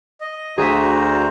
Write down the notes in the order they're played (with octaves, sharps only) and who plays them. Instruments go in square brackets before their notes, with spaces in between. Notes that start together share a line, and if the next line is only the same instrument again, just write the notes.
[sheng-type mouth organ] D#5
[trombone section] D2 [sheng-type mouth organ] F#4 C5 A#5 [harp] G#4 E5